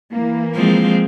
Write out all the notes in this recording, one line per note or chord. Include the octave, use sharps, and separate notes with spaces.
E3 A#3
F3 G#3 C4